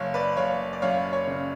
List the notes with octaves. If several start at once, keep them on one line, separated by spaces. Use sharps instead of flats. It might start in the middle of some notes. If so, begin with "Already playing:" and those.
Already playing: F#1 C#5 F5
B4 D5
F#1 C#5 F5
D5
F#2 C#5 F5
C#5
C#3